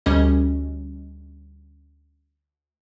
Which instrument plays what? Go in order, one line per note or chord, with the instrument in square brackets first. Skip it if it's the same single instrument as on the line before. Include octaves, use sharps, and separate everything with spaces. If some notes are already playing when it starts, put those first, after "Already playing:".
[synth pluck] D2 G3 C#4 D#5